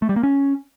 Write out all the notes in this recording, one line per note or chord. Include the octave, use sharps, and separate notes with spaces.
A3
G3
A#3
C#4